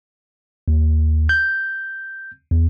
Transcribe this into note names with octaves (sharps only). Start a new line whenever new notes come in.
D#2
G6
E2